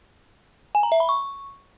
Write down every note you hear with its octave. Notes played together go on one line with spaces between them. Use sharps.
G#5
A#5
E5
B5
C#6